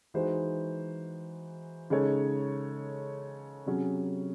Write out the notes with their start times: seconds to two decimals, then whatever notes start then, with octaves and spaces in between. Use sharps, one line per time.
0.14 E3 G#3 D#4 F#4 C5
1.90 C#3 G#3 D#4 A4 C#5
3.66 C3 F#3 C#4 G#4